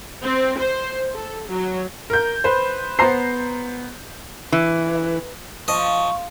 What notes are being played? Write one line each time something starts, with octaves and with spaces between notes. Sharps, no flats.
C4
C5
A4
F#3
A#4 G6
B4 C5
B3 C5 A#5 G6 C7
E3
F3 D#5 C#6